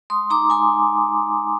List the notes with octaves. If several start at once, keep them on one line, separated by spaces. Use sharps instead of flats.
G#3 C6 D#6
D#4 A#5 D6
G#3 G#5 C6
D#4